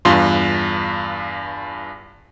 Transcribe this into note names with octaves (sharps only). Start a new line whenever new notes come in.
E2 G2 F4 C6